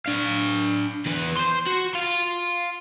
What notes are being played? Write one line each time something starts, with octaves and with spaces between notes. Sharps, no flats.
D4 F5
E2 B4
C5 C6
F#4
F5 C6